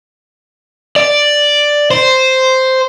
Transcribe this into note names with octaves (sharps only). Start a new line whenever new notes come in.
D5
C5